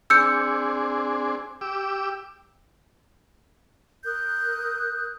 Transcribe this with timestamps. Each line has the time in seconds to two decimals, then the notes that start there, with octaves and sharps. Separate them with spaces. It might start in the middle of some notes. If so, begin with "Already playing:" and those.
0.10 C4 D4 G#4 E6 G6 C#7
1.61 G4 D6 E6
4.04 A#4 D#6 F#6 G6